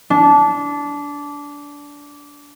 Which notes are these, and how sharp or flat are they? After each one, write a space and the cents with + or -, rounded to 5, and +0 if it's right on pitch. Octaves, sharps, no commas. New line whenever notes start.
D4 -20